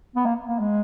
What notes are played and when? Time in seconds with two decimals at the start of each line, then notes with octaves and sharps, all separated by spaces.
0.16 B3
0.26 A#3
0.48 A#3
0.59 G#3